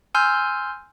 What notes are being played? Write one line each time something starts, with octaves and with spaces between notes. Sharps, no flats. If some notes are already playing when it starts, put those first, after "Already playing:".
G#5 C6 E6 F6 G6